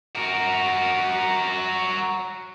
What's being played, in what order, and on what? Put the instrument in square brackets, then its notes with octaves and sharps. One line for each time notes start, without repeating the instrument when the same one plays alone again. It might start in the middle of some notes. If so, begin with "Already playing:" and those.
[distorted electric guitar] F#4 A#4